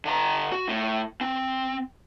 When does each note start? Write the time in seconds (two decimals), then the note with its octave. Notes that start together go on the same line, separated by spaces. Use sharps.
0.05 D3 A#5
0.52 F#4
0.69 A2
1.21 C4